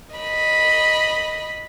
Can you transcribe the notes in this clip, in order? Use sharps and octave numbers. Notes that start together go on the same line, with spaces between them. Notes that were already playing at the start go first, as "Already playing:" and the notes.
D#5 B5